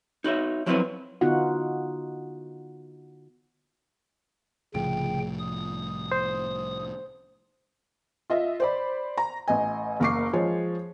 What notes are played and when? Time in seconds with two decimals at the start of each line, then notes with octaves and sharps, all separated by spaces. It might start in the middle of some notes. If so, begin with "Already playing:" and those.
0.24 D#4 F#4 C#5 E5
0.66 F3 F#3 C4 E4 B4 C#5
1.21 D3 B3 D#4 F4 F#4 F#5
4.74 C2 A2 C#3 F3 G5
5.39 D#6
6.12 C5
8.30 F4 D#5 E5
8.60 C5 D5 B5
9.18 A#5
9.48 A1 D#5 G#5
10.00 F#1 A#3 A#4 C#6 D6 C7
10.33 F3 G#3 C#5